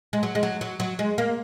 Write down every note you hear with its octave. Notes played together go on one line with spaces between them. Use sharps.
G#3
F#3
G#3
F#3
F#3
F#3
G#3
A#3